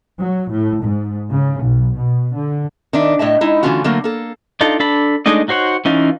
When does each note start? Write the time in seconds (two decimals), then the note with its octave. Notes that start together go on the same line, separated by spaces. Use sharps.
0.19 F#3
0.50 A2
0.83 G#2
1.31 C#3
1.60 B1
1.95 B2
2.35 D3
2.93 D#3 D4 E5
3.19 A2 D#5 E5 A5
3.41 G#3 D#4 E4
3.63 D3 E3 A3 C#4 F4 F#4
3.84 D3 F#3 A3 A#3 A#4
4.04 A#3 A4
4.61 D4 D#4 F4 A4
4.80 D4 A4 A5 B5
5.26 G#3 A3 D4 D#4 D#5
5.48 D#4 F#4 C5 C#5 F#5
5.85 E3 C#4 D#4 F4